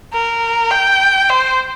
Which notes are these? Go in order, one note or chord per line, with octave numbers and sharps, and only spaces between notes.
A#4
G5
C5